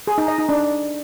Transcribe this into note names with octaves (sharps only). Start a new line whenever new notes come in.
G#4
D#4
D#5
D#4
D4